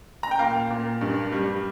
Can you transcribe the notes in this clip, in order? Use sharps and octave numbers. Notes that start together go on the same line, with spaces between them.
A#5
G5
A#2 F5
A#2
G2
G3